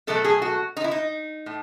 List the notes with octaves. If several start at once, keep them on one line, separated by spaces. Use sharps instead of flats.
B2 F#3 A3 A4
G#4
F#4
D#4
E4
D#4
A2